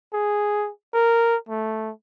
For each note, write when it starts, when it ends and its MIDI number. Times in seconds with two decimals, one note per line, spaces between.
0.13 0.70 68
0.93 1.36 70
1.49 1.91 57